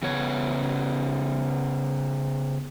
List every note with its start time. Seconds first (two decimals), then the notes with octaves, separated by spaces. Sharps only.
0.03 C#3 B3 C#5